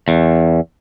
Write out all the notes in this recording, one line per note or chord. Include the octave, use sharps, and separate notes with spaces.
E2